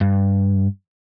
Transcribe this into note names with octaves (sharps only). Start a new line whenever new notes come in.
G2